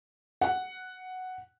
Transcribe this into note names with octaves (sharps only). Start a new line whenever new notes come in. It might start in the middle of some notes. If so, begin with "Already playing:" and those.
F#5